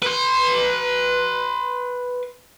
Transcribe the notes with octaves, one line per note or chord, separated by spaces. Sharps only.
B4 C6